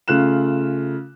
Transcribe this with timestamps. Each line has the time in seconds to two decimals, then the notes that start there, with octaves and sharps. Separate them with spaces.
0.08 C#3 A3 F4 F#6 E7